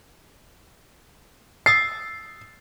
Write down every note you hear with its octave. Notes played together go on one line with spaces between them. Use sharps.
D#6 E6 A6 C7